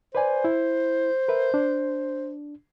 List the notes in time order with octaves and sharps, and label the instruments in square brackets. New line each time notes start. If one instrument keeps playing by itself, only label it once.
[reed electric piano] B4 D5 G#5 [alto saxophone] C5
[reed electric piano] E4
A#4 B4 E5
D4